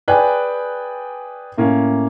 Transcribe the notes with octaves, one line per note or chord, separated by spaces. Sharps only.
G#4 B4 D5 G5 G#5 F#6
A2 A#3 C#4